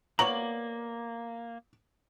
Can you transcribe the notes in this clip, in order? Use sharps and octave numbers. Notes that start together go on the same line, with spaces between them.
A#3 B3 C#5 D5 A#5 F#7